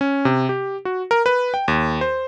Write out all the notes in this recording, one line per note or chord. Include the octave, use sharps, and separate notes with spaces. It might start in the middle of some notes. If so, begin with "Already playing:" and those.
C#4
C3
G4
F#4
A#4
B4
G5
D#2
C5